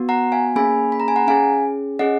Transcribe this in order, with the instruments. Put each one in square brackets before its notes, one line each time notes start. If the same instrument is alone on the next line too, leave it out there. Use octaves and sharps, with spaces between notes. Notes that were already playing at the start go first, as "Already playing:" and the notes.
Already playing: [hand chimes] B3 F#4
F#5 A#5
F5 G#5
A#3 C#4 G#4 G#5 B5
B5
A#5
G#5
F#5 A#5
C#4 G#4 F5 G#5
C#4 G#4 D#5 F#5